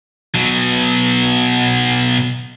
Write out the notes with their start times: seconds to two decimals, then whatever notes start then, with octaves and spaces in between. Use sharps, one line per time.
0.35 B2 F#3